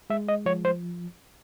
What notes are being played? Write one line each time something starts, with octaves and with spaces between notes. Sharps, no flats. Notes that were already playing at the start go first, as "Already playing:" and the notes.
G#3 E5
D#5
F3 C#5
C5